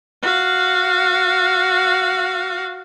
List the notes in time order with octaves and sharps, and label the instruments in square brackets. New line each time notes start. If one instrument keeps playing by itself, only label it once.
[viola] F#4 F5